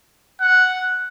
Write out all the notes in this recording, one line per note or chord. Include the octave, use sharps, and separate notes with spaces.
F#5